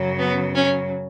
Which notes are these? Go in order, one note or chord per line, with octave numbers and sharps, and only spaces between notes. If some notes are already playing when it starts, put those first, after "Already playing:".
Already playing: F#2 C#3 F#3
B3
C#4